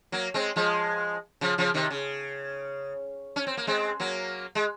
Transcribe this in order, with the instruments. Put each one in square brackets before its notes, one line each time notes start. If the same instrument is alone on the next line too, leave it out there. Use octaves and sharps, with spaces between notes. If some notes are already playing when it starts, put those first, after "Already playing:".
[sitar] F#3 A#3
G#3 C4
F3 G#3
C#3 F3
C#3 F3
C3 D#3
C#3
C#4
C4
A#3
G#3 C4
F#3 A#3
G#3